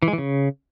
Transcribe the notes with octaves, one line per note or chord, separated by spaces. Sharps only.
E3
G#3
E3
C#3